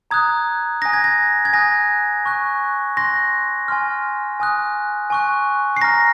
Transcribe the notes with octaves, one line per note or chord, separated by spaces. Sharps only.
A#5 D#6 F#6 G#6
G#5 D#6 F#6 A#6
G#6
A#6
G#6
G#5 D#6 F#6 A#6
G#5 C#6 F#6
C6 F#6 A#6
G#5 C6 F6
G#5 D#6 F#6
G#5 C#6 F#6
C7
A#5 F6 A#6